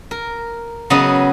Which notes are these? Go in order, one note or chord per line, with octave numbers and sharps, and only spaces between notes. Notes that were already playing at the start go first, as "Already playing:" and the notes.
A#4
C#3 F#3 B3 D#5